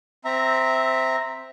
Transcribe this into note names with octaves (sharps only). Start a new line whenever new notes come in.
C4 E5 A#5